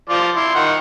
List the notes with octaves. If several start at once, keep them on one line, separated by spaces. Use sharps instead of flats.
F3 F4 D5
E4 C6
D#3 D#4 F#5